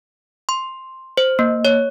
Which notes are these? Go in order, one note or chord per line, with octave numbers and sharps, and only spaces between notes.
C6
C5
A#3
C#5